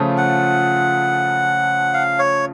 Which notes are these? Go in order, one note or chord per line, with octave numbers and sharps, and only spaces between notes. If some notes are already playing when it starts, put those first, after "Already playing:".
Already playing: C#3 F3 A3 F4
F#5
F5
C#5